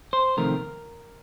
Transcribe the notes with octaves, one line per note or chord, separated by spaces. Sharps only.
C5
F2 C3 D#3 A3 C4 A#4